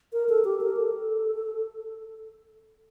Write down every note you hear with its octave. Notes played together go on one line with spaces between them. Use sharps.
A#4
A4
G4
A#4
A4